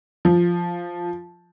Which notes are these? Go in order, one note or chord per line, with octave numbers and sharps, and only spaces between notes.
F3